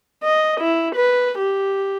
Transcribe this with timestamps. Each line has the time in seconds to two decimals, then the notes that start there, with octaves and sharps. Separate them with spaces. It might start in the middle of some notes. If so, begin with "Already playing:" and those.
0.23 D#5
0.60 E4
0.95 B4
1.38 G4